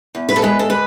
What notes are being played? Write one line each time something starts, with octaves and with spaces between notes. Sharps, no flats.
E2
B4
A4
G#3 B4
A4
D3 B4